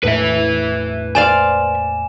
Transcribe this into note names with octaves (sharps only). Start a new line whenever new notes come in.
E1 A2 B4 E5
C5 D5 F5 G#5 E7